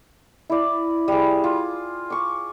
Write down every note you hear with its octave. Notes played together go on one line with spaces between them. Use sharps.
E4 D5
G3 G#4
F4
C#6 D6